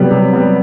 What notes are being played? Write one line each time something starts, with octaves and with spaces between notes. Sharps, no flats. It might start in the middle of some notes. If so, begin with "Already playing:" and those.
Already playing: C3 F#3 G3 B3
C3
G3 B3